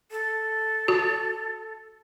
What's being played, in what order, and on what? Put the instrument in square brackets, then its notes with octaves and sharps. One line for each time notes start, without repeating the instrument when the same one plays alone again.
[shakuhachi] A4
[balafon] F#4